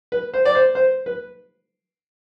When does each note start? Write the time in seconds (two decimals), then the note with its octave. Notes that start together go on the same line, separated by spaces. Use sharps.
0.12 B4
0.34 C5
0.45 D5
0.55 C5
0.75 C5
1.06 B4